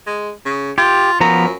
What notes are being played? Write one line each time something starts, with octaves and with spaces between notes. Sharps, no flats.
G#3
C#3
F4 G4
F#2 F3 B3 A#5